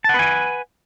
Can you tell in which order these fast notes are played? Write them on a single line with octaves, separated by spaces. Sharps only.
A5 F#5 B4 G#5